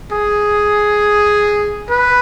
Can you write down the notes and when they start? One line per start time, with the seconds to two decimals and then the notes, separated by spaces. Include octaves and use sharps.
0.12 G#4
1.90 B4